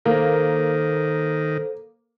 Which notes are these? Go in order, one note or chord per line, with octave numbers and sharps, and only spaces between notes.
D#3 A#3 A4 C5